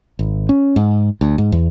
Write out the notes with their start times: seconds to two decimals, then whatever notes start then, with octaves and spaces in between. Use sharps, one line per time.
0.19 G#1
0.49 C#4
0.76 G#2
1.21 D2
1.38 G#2
1.52 E2